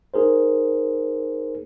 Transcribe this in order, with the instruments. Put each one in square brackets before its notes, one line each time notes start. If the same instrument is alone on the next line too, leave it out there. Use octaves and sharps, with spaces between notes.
[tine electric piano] D#4 G#4 A#4 C5